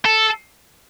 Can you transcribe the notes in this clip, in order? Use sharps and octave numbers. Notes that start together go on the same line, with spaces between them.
A4